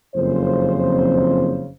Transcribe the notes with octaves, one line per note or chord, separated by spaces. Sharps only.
F#1 F2 C#3 C5